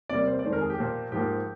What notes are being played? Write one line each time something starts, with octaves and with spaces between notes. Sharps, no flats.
C3 G3 A#3 D5
C5
D5
F2 D#3 G#3 C5
A#4
G#4
G4
A#2 F3 A#3
G#2 F3 A#3 G4